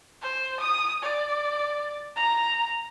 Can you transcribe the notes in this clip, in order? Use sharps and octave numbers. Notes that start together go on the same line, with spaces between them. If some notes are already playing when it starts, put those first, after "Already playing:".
C5
D#6
D5
A#5